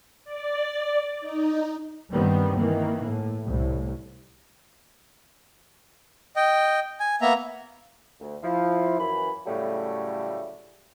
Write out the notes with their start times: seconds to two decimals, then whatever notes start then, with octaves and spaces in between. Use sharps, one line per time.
0.25 D5
1.21 D#4
2.11 G2 D#3 G3 B3 C4
2.57 D#3 E3 A#3
3.06 A2
3.47 C2 A2
6.36 D#5 G5
7.00 G#5
7.21 A#3 B3 E5 A#5
8.21 D2
8.43 F3 E4
8.99 F#2 E3 B5
9.46 A2 C#3 F#3 G3 A3